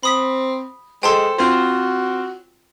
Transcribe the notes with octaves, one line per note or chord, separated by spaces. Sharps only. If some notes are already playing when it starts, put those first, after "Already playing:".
C4 B5 D#6 B6
G#3 A4 C5 G5 A5 C6
C4 F4 F#4 C5